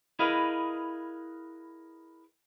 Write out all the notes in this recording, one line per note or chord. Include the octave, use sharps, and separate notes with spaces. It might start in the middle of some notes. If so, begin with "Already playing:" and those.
E4 G#4 A#4 B4 D#5 F5